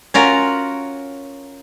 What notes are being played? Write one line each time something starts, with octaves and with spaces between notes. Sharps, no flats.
C#4 F4 F#4 A#4